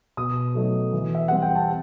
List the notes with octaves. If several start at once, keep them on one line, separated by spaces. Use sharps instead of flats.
B2 D#6
F#3 A3 D#4
E3
E5
G3 C4 F#5
G5
A5